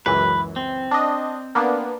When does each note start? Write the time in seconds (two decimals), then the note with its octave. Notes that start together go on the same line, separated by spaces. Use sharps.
0.06 C#2 F#2 E3 B4
0.56 C4
0.91 D4 D#5
1.55 A#3 B3 D4